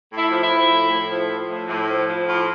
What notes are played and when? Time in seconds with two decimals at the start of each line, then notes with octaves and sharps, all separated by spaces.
0.10 A2
0.17 E4
0.30 F3
0.43 E4
0.50 F3
0.69 A2
0.89 A2
1.09 F3
1.29 F3
1.48 A2
1.68 A2
1.89 F3
2.08 F3
2.28 A2 F4